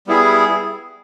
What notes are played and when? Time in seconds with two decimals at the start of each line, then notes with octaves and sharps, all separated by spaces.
0.07 G3 B3 E4 G#4